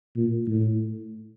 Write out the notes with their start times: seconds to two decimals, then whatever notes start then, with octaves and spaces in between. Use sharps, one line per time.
0.17 A#2
0.47 A2